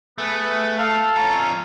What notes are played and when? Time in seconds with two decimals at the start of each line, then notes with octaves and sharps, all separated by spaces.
0.18 A3 B3 G#4 B4
0.78 A4 F5
1.17 F2 C#4 F4 A#5